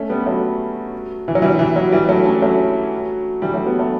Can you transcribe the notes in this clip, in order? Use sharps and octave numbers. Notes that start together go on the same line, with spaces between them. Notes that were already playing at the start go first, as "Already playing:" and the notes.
Already playing: A3 C#4
G3 B3
F#3 A3
E3
F#3
E3 G3
F#3
E3
F#3
E3 G3
F#3 A3
A3 C#4
F#3 A3
E3 G3
F#3 A3
G3 B3
F#3 A3